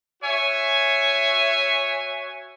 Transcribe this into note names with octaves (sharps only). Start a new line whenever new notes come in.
F#4 C#5 E5 G#5